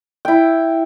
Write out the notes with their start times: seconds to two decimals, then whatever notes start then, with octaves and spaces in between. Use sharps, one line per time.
0.25 E4 G5